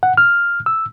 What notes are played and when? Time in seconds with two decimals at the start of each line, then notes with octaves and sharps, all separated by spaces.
0.03 F#5
0.17 F6
0.66 E6